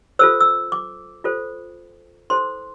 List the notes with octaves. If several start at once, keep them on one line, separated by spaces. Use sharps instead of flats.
F4 A4 C5 E6
E6
D6
F4 A4 C5
E4 A4 C5 C6